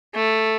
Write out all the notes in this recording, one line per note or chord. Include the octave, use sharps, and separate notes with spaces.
A3